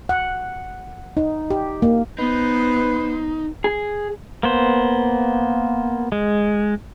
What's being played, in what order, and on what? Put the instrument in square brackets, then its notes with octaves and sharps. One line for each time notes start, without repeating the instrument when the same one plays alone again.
[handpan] F#5
D#4
G4
A#3
[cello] B3 C5 [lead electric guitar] D#4 [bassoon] B4
[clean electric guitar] G#4
[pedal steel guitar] A#3 B3 C5
G#3